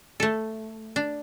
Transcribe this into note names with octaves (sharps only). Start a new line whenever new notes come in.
A3 A4
D4